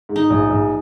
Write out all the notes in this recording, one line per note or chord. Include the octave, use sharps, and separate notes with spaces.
G#2
D#4
A#1
A#1